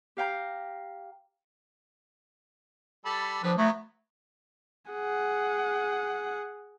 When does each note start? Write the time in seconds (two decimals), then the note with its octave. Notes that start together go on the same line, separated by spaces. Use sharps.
0.17 G4 F5 G5 A#5
3.05 G3 A4 B5
3.43 D3 F3 G3 B4
3.58 F#3 A3 B3
4.91 G#4 F#5